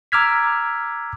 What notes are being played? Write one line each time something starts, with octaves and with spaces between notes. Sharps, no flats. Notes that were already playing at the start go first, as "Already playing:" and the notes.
A#5 D6 E6 F6 G#6 B6